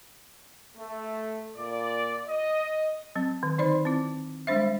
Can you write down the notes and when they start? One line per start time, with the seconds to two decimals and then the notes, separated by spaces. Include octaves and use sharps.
0.77 A3
1.56 A#2 D5
2.27 D#5
3.16 F#3 C4
3.43 D#3
3.58 D3 D#4 C5 D5 B5
3.85 C4 E4
4.47 G3 G#3 D4 C5 E5